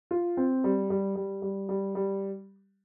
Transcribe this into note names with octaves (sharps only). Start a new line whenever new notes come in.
F4
C4
G3
G3
G3
G3
G3
G3